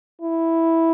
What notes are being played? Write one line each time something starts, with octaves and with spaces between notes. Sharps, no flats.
E4